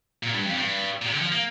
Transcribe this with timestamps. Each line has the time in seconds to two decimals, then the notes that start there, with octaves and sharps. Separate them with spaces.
0.23 A#2
0.34 G2
0.46 F2
0.57 G2
1.02 A#2
1.06 C3
1.12 D3
1.21 F3
1.32 A#3